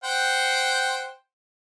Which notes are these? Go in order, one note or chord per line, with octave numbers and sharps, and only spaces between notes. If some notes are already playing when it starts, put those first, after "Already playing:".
C5 F#5 G5